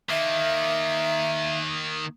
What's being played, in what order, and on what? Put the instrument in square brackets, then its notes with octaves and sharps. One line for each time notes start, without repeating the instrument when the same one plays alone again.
[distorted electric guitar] D#3 A#3 [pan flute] E5